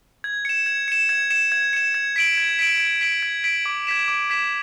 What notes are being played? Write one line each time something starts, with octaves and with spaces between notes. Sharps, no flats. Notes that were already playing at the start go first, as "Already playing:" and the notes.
G#6
C#7 E7
G#6
C#7 E7
G#6
C#7 E7
G#6
C#7 E7
G#6
B6 D7 F#7
G#6
B6 D7 F#7
G#6
B6 D7 F#7
G#6
B6 D7 F#7
D6
G#6 B6 E7
D6
G#6 B6 E7